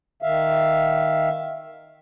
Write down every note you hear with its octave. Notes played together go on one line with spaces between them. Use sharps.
D#3 E5 F5